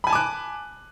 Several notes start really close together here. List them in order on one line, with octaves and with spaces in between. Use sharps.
B5 G#5 A5 D6 F#6